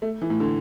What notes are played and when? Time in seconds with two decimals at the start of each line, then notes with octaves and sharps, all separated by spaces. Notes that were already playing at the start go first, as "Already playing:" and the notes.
0.02 A3
0.22 E3
0.30 A2
0.40 D3